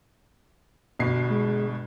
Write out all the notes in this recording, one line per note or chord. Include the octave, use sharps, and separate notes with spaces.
G1 B2 C7
G#3